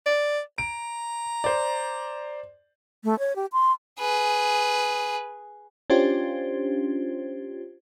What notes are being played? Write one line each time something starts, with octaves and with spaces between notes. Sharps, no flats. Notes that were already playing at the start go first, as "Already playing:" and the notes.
D5
A#5 D7
C5 D5
A3
C#5
G4
C6
G#4 B4
C#4 D4 F4 G4 C5